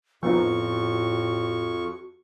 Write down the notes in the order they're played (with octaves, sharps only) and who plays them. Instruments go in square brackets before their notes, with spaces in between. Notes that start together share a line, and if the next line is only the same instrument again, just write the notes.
[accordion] F2 C#6 [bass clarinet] A2 [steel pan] F3 B3 D#4 [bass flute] F#4